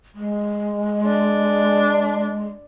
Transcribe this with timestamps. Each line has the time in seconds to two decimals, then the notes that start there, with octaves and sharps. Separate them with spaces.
0.15 G#3
1.05 D4